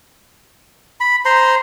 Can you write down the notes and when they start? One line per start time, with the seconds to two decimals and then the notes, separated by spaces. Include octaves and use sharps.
1.00 B5
1.25 C5 A#5 C6